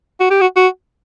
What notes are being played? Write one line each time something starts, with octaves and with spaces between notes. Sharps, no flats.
F#4
G4
F#4
F#4